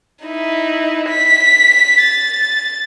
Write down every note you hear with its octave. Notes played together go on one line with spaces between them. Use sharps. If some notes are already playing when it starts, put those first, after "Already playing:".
D#4 E4
B6
A6